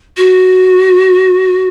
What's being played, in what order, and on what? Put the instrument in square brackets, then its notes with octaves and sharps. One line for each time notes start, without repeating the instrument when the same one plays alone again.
[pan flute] F#4